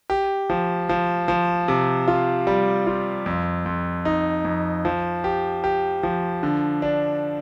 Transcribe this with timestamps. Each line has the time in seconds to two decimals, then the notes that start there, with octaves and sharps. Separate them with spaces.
0.10 G4
0.50 F3
0.89 F3
1.28 F3
1.68 C3
2.08 F4
2.47 G3
2.87 F4
3.26 F2
3.66 F2
4.05 D#4
4.45 F2
4.85 F3
5.24 G4
5.64 G4
6.03 F3
6.43 D3
6.82 D4